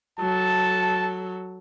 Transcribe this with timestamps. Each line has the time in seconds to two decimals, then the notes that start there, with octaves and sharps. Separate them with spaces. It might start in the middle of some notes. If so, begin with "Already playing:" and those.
0.19 F#3 A4 A5